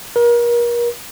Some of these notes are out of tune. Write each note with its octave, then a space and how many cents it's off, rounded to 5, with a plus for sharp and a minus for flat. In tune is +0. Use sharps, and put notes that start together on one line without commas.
A#4 +35